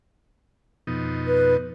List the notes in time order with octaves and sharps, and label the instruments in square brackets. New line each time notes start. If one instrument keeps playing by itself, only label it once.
[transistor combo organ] F2 B2 D#4
[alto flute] B4